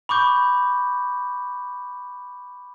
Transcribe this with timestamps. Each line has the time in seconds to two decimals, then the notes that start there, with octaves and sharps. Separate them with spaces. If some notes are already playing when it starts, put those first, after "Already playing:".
0.09 B5 C#6 D6 G6